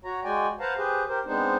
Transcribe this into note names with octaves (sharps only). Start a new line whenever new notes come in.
F#4 C#5 A#5
G#3 F#4 D5 G5 G#5
B4 C5 F5 F#5 A5 A#5
G4 G#4 B4 C5
G4 A#4 C5
G#3 B3 C4 D4 D#4 C5